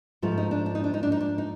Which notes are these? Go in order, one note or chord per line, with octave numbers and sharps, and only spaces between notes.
G#2 F3 A3 F4
D#4
D4
D4
D#4
D4
D#4
D4
D#4
D4
D#4